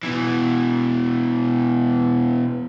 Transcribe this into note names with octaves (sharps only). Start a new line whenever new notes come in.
B2 E3